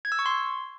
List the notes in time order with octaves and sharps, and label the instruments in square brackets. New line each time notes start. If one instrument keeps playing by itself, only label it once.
[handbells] G#6
E6
C#6
C6